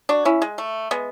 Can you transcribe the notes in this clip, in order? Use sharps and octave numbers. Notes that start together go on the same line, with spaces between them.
D4 F#4
C#4 E4
G#3
A3
G#3 B3